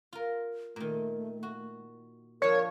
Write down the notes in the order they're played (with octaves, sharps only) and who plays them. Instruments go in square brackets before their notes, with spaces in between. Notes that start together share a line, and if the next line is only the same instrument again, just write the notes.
[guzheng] F4 A#4
[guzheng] A#2 D#3 [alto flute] A3
[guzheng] F#4
[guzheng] F3 D4 [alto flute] A#4 [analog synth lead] C#5